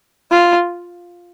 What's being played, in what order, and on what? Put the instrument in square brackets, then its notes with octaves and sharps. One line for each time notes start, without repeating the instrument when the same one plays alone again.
[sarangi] F4